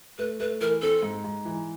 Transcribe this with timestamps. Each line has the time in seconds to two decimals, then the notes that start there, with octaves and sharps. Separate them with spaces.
0.18 A3 B4
0.40 A3 B4
0.61 E3 A#4
0.82 C4 A4
1.03 G#2
1.24 G#2
1.45 E3